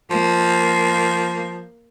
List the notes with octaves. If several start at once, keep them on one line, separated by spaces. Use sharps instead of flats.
F3 A#3